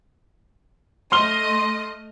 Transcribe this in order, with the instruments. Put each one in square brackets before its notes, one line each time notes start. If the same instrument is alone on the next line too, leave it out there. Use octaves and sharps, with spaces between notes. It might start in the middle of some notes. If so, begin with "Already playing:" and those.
[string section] A3 D#5 [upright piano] C6 F6 G7